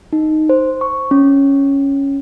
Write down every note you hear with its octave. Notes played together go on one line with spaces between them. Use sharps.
D#4
C5
C#6
C#4